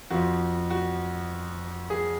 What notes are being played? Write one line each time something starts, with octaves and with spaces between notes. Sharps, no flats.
F2 F3 F#4
F#4
G#4